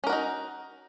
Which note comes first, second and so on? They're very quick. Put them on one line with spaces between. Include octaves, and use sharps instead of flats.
C#4 A#4 F#4 D#4